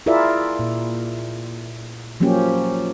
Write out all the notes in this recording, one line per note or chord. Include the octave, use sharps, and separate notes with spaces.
E4 F4 G#4 A#4 D5 E5
A#2
F3 F#3 A#3 C#4 G4